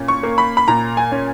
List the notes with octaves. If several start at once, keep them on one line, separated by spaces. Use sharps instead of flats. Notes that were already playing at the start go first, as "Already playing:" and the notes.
Already playing: A#2 C#4
C#6
A#3
B5
B5
A#2 A#5
G#5
C#4